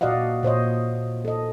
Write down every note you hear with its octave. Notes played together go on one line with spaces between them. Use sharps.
A#2 F#4 D5 D#5 F5 F#5
A#2 C5 C#5 D#5
A4 D#5